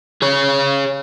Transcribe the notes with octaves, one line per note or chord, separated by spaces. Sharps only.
G#4 C#5